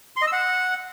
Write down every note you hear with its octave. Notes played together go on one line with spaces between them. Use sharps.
C6
D#5
E6
F#5